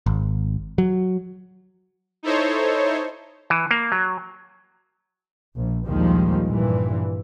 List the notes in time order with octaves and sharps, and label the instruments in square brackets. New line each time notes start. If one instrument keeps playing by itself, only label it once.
[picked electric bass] G#1
F#3
[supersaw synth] D#4 E4 A4 C5 C#5
[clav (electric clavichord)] E3
A#3
F#3
[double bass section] A#1
A#1 D#2 D#3 F3 G3 G#3
G2 A#2 E3